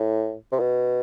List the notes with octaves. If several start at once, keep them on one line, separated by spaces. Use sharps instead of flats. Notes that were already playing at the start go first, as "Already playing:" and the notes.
Already playing: A2
C3
B2